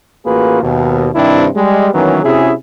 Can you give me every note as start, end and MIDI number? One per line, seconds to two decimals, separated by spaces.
0.26 0.60 33
0.26 0.60 58
0.26 0.60 65
0.26 0.60 66
0.26 0.60 68
0.26 0.60 71
0.62 1.09 39
0.62 1.09 47
1.15 1.48 43
1.15 1.48 48
1.15 1.48 51
1.15 1.48 60
1.15 1.48 62
1.15 1.48 64
1.56 1.90 55
1.56 1.90 56
1.93 2.22 51
1.93 2.22 52
1.93 2.22 54
1.93 2.22 58
1.93 2.22 59
1.93 2.22 61
2.23 2.53 48
2.23 2.53 61
2.23 2.53 64
2.23 2.53 66
2.23 2.53 68